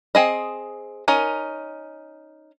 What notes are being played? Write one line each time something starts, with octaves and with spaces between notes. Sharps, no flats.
C4 G#4 D#5
C#4 D#4 A#4